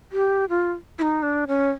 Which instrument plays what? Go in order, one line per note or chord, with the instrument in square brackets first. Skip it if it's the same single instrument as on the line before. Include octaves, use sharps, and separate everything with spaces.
[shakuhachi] G4
F4
E4
D#4
D4
C#4